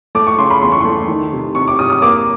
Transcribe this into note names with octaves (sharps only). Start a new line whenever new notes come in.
A3 D6
C#6
C#3 C6
B5
E2 C6
C#6
A3 C6
D#3
C3
C3 C#6
D6
C3 D#6
D#6
A#3 D6